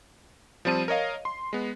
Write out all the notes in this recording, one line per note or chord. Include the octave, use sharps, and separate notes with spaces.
F3 G3 C4 A5 D#7
A#4 C#5 D#5 F5
C6
G#3 B3